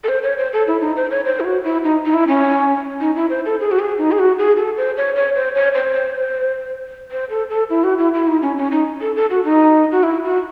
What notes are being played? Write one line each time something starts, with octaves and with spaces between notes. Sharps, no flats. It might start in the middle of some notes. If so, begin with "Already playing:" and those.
A4
C5
C#5
C5
A4
E4
D#4
C5
C#5
C5
E4
F#4
E4
D#4
D#4
E4
C#4
D#4
E4
C5
A4
G#4
F#4
G#4
D#4
G#4
F#4
G#4
A4
C5
C#5
C#5
C5
C#5
C5
C5
A4
A4
E4
F#4
E4
E4
D#4
C#4
C#4
D#4
A4
A4
F#4
D#4
F#4
E4
F#4